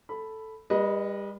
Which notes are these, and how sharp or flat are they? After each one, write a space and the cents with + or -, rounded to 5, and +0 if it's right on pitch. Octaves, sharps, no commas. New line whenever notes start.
A4 +0 B5 +0
G3 +35 B4 -30 D#5 +0